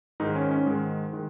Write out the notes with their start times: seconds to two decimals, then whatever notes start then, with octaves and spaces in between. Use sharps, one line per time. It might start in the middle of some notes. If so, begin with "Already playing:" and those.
0.20 G#2 D#3 G#3 D#4
0.35 C#4
0.51 C#4
0.66 G#2 D#3 G#3
1.13 D#3 G#3